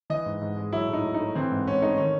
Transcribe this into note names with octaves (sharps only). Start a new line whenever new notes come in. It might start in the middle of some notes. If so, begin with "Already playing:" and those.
E3 D#5
G#2
G#2
G#3
F#3 E4
A2 D#4
A2
D#4
A3
E3 C4
G#2
G#2 C#4
A3 D#4
D#3 C#4